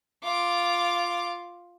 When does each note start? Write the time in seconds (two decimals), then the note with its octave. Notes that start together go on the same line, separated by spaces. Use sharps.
0.23 F4 D6